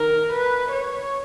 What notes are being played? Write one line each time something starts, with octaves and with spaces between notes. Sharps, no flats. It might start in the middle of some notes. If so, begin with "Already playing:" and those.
Already playing: D#3 A#4
B4
C#5